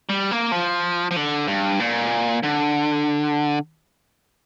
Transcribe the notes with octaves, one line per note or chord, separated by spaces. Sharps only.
G3
A#3
F3
F3
D3
G2
A#2
D3